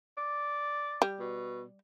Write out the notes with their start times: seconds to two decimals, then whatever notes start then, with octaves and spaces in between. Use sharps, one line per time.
0.17 D5
1.02 G3
1.20 B2